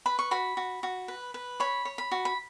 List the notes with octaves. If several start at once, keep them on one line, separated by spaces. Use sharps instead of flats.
B4 B5
C#6
F#4 B5
F#4
F#4
B4
B4
C#5 B5
C#5
B5
F#4
B5